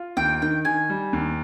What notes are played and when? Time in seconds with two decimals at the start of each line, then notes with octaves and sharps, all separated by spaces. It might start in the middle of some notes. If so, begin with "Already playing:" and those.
Already playing: F4
0.17 D#2 G5
0.42 D#3 G5
0.65 D#3 G#5
0.89 G3
1.13 D#2